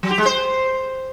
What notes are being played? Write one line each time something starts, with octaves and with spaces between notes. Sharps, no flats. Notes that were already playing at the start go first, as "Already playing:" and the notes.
F#3
G4
G#3
C5